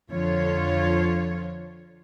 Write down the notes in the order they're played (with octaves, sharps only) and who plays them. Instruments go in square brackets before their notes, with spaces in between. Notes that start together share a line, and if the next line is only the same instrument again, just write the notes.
[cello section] F2 D3 F4 C#5